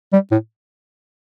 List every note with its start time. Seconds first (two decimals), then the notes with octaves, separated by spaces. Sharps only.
0.13 G3
0.32 A2